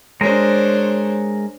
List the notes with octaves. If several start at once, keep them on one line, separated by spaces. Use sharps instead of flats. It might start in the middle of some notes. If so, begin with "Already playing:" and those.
G#3 D4 A#4 C5 C#5